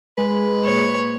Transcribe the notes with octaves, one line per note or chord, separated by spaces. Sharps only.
G#3 B4
A#2 C#5